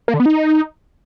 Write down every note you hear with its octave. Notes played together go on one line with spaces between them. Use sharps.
A#3
D3
B3
D#4